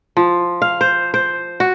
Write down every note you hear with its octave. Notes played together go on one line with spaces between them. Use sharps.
F3
F5
C5
C5
F#4